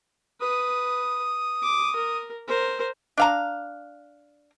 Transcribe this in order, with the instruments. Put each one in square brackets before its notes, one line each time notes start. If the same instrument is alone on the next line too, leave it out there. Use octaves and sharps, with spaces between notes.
[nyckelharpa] B4 [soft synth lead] D#6
[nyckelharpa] D6
A#4
A#4 C5
[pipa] D4 F5 A#5